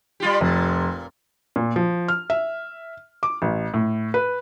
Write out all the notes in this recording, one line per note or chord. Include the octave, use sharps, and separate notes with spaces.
G3 F4 G4
F1 A#2
A#2
F3
F6
E5
D6
A1
A2
B4